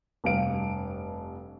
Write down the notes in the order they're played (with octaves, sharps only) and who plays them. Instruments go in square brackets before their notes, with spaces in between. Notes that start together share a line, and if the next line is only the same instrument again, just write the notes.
[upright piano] F1 G2 F5 D7